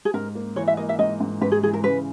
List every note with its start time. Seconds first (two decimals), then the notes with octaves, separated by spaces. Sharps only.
0.05 G#4
0.14 G#2 A#4
0.35 A#3
0.56 E3 C#5
0.67 E5
0.77 A#3 D#5
0.89 E5
0.99 G#2 D#5
1.20 G#2
1.42 G#2 B4
1.52 G#4
1.63 E3 G#4
1.74 A#4
1.84 C#3 B4